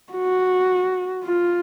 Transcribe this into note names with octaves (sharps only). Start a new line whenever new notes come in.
F#4
F4